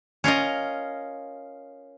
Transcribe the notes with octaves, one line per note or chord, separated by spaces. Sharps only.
C#4 F4 A#4 D#5